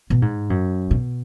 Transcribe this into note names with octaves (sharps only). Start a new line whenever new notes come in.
B2
G#2
F#2
B2